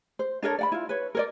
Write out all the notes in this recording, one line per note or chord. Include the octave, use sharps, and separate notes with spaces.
C5
D4 A4 A#4 C#5
D5 F#5 B5
E4 F4
B4 C#5
A#4 C#5 D5